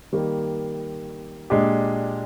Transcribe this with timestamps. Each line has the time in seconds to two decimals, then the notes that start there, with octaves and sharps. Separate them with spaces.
0.13 D#3 G3 A#3
1.50 A#2 G#3 D4 G4